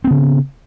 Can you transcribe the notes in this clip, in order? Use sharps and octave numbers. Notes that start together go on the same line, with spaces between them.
C#3 B3 C4